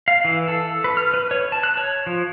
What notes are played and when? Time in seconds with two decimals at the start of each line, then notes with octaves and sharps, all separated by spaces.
0.08 F5
0.25 E3
0.48 A4
0.84 B4
0.97 F6
1.14 B4
1.31 C#5
1.52 A5
1.63 F#6
1.77 C#5
2.07 F3